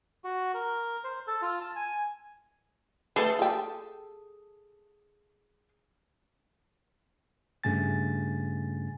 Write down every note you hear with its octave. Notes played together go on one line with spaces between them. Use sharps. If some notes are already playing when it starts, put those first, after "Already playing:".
F#4
A#4
C5
A4
F4
A5
G#5
A3 G#4 A4 B4 A5
F4 G4
G2 C#3 A3 G#5 A6